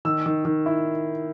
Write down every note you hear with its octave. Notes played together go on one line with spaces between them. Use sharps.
D#3 E6
D#3
D#3
E4